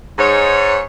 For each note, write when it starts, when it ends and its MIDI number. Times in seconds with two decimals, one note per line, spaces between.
0.18 0.79 44
0.18 0.79 73